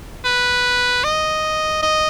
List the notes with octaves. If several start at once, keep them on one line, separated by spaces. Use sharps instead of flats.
B4
D#5
D#5